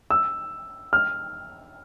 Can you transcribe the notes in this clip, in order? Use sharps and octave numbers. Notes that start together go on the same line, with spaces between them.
E6
F6